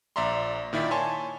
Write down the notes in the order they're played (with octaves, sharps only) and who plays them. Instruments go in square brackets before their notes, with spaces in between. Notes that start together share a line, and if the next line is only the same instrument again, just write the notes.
[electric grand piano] A#1 D5 E5 A#5 C6
A#2 D#3 E4 D5 B6
C#5 G#5 A5 C6 C#6